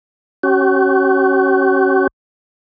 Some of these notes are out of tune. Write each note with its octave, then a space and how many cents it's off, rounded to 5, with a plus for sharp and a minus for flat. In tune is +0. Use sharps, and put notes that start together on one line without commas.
C#4 -15 F#4 +45